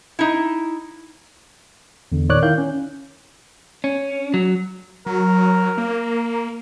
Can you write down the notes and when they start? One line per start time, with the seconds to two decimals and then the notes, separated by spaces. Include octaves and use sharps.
0.19 D#4 E4
2.12 E2 D3
2.29 A#2 D#3 C#5 D5 D6 F#6
2.42 D#3 E4 F5 G6
2.58 C#4
3.84 C#4
4.34 F#3
5.06 F#3 A#4
5.78 A#3